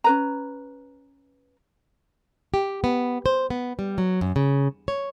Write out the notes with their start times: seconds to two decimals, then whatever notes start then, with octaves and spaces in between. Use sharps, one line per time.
0.04 C#4 B4 A#5
2.54 G4
2.84 B3
3.26 C5
3.50 B3
3.79 G3
3.98 F#3
4.21 F#2
4.36 C#3
4.88 C#5